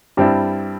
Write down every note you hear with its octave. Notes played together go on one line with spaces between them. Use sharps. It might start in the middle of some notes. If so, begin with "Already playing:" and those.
G2 G3 C4 E4